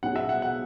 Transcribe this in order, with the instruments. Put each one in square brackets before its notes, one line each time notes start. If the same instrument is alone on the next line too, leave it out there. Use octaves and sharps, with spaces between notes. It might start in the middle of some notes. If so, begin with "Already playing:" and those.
[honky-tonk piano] B1 B2 F#3 C#4 G#4 [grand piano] F#5
[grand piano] E5
F#5
F#5